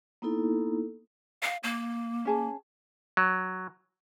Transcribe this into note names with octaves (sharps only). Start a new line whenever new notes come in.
A#3 B3 D#4 E4 A4
F5
A#3
C#4 G#4 A5
F#3